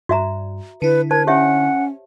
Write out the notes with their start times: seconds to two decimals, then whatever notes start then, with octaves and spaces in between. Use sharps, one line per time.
0.09 G2 F#4 E5 A#5
0.82 D3 E4 B4
1.11 A#4 C5 A5 G#6
1.27 C#4 G4 C#5 E5 F#5